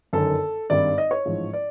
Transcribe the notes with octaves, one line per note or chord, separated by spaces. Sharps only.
G1 F#2 D#3 A4
G#1 G2 D#3 G3 D5
D#5
C#5
A1 G#2 F3
D5